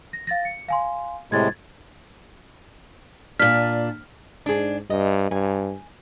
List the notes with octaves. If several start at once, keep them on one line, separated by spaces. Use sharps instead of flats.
A#6
F5 A6 A#6
C#7
F5 G#5 C6
A2 C3 G#3 G#6 A6
A#2 D4 F6 B6
G#2 D4 G#4
G2 D#5
G2 G#5